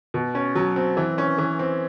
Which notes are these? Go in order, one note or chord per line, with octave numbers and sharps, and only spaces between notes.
B2
C#4
F#3
C4
E3
C#4
E3
C4